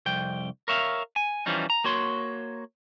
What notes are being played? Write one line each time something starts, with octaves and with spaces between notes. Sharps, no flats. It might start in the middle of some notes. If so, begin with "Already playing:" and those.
C2 F2 G5
A#4 C#5 E5 F5
G#5
E3 F3 G3 C#4 D#4
A#5
A#3 F#4 C#5 C6